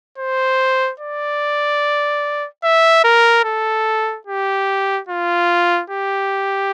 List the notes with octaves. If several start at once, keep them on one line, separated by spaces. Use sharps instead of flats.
C5
D5
E5
A#4
A4
G4
F4
G4